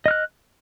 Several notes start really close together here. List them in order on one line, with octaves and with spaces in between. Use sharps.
D#5 F6 F#6